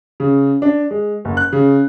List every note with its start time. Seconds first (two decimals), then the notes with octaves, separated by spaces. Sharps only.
0.20 C#3
0.62 D4
0.91 G#3
1.25 F#1
1.37 F#6
1.53 C#3